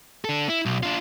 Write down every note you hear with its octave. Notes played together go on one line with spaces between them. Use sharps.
D4 A4
E4
B1
D4 F4